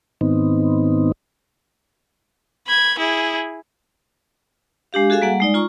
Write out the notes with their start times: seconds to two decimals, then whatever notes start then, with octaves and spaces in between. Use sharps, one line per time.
0.21 G#2 D#3 B3 C4 D#4
2.67 B5 G#6
2.99 E4 G#4
4.93 G#3 D4 G4 F5
5.10 F#4 G#4 A4 E5 F5 G#5
5.22 G3 A#3 F#5
5.40 G#3 D#4 D5
5.54 F4 A#5 C#6